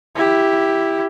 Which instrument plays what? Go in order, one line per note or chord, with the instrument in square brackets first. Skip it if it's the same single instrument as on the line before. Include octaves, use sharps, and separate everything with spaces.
[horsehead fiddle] E4 G4